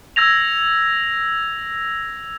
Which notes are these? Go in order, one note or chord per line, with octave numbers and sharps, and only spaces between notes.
E6 G#6 A#6 F7